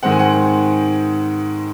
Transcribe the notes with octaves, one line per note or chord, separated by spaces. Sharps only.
G#2 D#3 G#3 C4 F#5
G#5
F#5